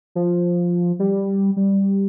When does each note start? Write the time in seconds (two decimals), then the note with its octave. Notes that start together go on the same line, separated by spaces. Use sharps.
0.15 F3
0.99 G3
1.57 G3